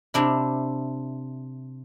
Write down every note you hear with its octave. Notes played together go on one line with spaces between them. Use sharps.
C3 D4 E4